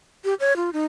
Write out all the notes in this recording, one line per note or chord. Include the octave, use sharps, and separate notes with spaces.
G4
C#5
F4
D#4